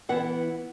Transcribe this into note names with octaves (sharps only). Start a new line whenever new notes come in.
E3 B3 E4 F#5